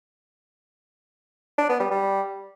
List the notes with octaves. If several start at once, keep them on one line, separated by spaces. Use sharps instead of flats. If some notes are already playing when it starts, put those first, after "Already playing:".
D4
B3
G3
G3